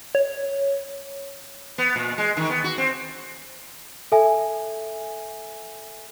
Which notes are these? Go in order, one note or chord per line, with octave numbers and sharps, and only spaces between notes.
C#5
B3
A#2
G#3
D#3
B3
F#4
C4
A4 E5 G#5